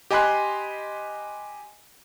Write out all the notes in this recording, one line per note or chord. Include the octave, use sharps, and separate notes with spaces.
G4 D#5 G#5 B5 C6 F#6